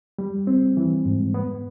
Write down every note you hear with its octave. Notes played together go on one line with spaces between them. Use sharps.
G3
C4
E3
G#2
B3